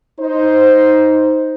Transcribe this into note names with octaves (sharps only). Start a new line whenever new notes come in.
D#4 C5